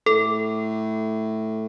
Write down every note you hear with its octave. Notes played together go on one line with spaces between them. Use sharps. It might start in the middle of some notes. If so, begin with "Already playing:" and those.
A2 A4